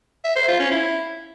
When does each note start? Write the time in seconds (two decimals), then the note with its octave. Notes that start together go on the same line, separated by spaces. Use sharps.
0.24 E5
0.36 C5
0.48 F4
0.59 C#4
0.71 E4